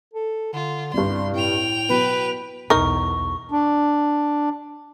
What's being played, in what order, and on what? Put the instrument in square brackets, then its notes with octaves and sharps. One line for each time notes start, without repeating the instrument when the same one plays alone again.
[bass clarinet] A4
[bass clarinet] D3 [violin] F4
[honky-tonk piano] C2 G2 [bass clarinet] G3 [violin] C6
[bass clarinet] A2 [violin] G5 F7
[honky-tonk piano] B2 F#3 [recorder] B4
[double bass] B1 E2 [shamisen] D#4 A#4 [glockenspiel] C#6
[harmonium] D4